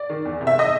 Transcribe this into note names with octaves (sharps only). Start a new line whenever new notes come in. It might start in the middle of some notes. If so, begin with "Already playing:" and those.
Already playing: D5
D#3
E2
C3
E5
D#5